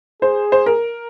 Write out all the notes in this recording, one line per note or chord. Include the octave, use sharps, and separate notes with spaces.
G#4 C5
C5
A#4